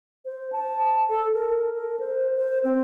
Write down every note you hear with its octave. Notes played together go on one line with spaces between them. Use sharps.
C5
A5
A4
A#4
A#4
C5
C5
C4